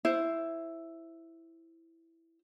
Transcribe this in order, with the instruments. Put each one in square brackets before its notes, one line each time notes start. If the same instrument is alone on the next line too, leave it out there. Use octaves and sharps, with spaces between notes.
[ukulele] E4 C5